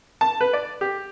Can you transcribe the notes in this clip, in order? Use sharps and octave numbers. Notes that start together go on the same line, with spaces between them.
A5
B4
D5
G4